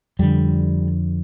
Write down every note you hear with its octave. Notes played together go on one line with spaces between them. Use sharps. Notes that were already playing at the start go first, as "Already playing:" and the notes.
F2 D3 G3